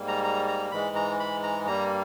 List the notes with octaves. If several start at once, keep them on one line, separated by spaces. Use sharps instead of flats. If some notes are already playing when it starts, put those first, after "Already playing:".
Already playing: G#2 G3 A#3
A#5
A#5
A#5
G#2 E3 G#3 B5
A#5
B5
A#5
G2 G3 A#3 A#5